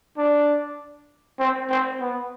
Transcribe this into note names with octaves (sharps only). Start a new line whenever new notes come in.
D4
C4
C4
B3